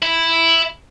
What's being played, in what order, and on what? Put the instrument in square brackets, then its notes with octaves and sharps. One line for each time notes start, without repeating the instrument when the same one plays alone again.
[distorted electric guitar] E4